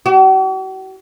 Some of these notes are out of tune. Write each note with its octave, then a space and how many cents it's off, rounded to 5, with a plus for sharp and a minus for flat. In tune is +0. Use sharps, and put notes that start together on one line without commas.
F#4 +45